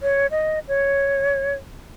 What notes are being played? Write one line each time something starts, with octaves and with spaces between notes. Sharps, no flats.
C#5
D#5
C#5